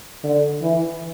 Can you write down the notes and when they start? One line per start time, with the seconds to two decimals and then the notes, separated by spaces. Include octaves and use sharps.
0.24 D3
0.62 E3